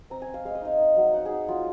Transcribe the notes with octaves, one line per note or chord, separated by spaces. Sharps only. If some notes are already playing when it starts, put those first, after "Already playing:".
C4 A#5
G#5
C4
F5
G#3 F5
D#5
D#4 F5
D#4
F#3
D#4 F#5
D#4 G#4
F#3 F4